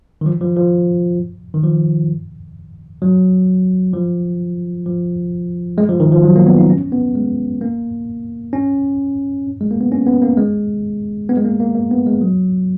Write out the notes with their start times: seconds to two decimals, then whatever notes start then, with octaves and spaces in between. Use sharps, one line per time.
0.21 D#3
0.26 F3
0.41 F3
0.56 F3
1.54 D#3
1.63 F3
3.02 F#3
3.94 F3
4.86 F3
5.78 G#3
5.89 F3
6.00 D#3
6.12 F3
6.24 F#3
6.36 A#3
6.47 B3
6.58 D#4
6.70 C#4
6.92 B3
7.16 G#3
7.61 A#3
8.53 C#4
9.61 G#3
9.71 A#3
9.81 B3
9.92 C#4
10.07 B3
10.22 A#3
10.37 G#3
11.29 B3
11.37 G#3
11.45 A#3
11.60 A#3
11.75 A#3
11.91 B3
12.06 G#3
12.21 F#3